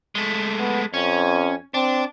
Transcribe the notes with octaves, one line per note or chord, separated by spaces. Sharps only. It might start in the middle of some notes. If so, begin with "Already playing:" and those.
G#3 A3
B3
F2 C#4
C4 D4